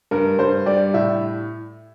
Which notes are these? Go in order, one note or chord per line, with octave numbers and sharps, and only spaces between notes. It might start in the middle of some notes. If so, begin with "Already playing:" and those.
G2 A#4
G2 C5
G3 D5
A2 E5